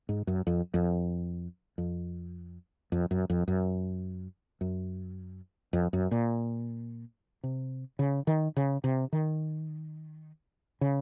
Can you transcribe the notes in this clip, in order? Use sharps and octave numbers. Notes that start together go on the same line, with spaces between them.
G#2
F#2
F2
F2
F2
F2
F#2
F2
F#2
F#2
F2
F#2
A#2
C3
C#3
D#3
C#3
C3
D#3
C#3